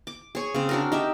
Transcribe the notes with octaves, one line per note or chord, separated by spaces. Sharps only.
D6
G#4 C#5
C#3 C4
D4 F#4 A#4
D#4 G4 E5